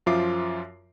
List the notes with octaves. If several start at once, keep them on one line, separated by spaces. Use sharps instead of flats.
F#2 F3 F4 E5 D6 C7